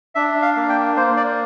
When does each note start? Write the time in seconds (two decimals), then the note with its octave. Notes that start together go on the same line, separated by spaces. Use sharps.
0.15 D4 E5
0.42 F5
0.56 A#3
0.69 G5
0.96 A#3 C5
1.17 D5